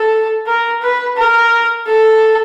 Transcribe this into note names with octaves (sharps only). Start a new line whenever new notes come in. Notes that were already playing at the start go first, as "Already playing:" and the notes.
Already playing: A4
A#4
B4
A#4
A4